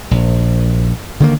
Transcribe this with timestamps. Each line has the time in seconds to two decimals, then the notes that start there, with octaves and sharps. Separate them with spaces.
0.11 A#1
1.20 D3 D#3 A#3